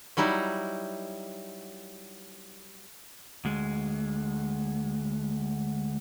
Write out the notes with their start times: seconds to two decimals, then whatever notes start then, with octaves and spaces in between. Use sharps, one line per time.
0.17 F#3 G3 D#4 E4
3.45 D2 G#3